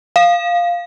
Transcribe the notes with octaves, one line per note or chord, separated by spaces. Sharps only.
F5